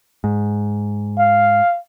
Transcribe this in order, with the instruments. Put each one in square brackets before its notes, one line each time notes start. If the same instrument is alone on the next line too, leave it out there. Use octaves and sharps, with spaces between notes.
[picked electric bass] G#2
[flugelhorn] F5